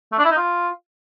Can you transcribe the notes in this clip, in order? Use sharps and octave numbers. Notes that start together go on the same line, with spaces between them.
A3
D4
E4
D#4
F4